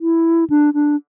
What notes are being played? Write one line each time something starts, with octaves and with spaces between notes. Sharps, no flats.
E4
D4
D4